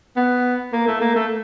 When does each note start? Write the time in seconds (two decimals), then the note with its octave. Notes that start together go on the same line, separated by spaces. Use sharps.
0.17 B3
0.73 A#3
0.88 A3
1.01 A#3
1.16 A3